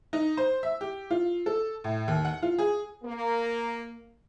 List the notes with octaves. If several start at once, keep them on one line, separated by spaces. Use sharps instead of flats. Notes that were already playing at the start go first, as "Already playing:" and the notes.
D#4
C5
E5
G4
F4
A4
A2
D#2
F#5
F4
G#4
A#3